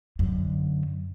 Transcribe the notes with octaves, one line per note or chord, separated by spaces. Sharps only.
F#2 D3